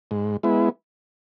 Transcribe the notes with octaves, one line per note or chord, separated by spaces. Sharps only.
G#2
G#3 B3 E4